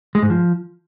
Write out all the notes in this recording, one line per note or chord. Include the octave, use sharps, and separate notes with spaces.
G#3
G#2
F3